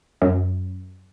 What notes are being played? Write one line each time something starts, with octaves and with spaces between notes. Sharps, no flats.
F#2